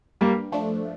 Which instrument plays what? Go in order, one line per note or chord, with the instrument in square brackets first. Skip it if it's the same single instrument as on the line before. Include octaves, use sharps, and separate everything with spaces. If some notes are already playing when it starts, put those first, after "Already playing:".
[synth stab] G2 [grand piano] G3 A#3
[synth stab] F3 A3 D4